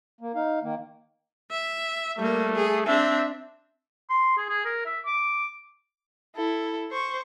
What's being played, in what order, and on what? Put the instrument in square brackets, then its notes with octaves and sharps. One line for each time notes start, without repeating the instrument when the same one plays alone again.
[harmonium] A#3
D#4 F5
D#3 A#3
[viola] E5
[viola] G3 A#3 [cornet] A3
[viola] G#4
[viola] C4 D4 [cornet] E5
[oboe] C6
G#4
G#4
A#4
E5
D6
[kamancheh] E4 A4
C5 C#6